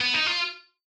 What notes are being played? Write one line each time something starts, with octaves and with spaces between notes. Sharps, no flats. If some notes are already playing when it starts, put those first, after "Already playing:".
B3
D#4
F4